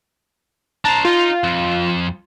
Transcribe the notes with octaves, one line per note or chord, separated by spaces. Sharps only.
D4 C5 A5 A#5
D#4 F4
F2